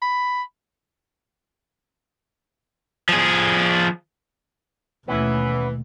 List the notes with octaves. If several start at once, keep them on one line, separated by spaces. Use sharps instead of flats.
B5
F3 G#4
D#2 B2 E3 A3 B3 C#4 E4